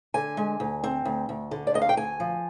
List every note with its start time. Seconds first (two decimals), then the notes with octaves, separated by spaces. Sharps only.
0.14 D3 G#5
0.37 G#3
0.60 D2
0.84 C4
1.05 D2
1.29 D2
1.51 D3
1.67 D5
1.74 D2 D#5
1.82 F5
1.89 G5
1.97 D2 G#5
2.20 F3